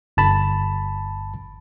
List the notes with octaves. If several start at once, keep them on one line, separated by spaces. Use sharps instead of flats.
G1 A5 B5